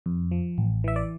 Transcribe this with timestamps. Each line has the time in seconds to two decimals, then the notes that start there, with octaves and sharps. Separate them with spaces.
0.06 F2
0.31 F3
0.58 A1
0.84 E3 E5
0.96 D5